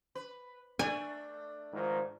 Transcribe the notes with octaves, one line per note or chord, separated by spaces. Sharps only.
B4
A3 D4 G#5
G#2 D#3 F3